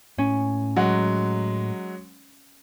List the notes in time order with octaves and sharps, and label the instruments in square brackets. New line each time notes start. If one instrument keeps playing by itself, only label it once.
[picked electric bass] A2 [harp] C#4
[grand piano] F#3 G#3 F#5